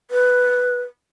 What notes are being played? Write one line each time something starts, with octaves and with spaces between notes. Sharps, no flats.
B4